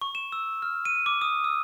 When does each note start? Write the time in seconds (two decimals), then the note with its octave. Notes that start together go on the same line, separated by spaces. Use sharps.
0.01 C#6
0.15 E7
0.32 E6
0.62 F6
0.85 D#7
1.06 D6
1.21 D#6
1.44 E6